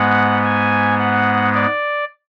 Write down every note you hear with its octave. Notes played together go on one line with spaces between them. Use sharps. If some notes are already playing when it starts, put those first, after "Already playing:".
Already playing: G#2 G#3 B3 F#5
G#5
F#5
D5